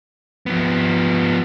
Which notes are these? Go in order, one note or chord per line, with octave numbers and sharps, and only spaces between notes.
F3 B3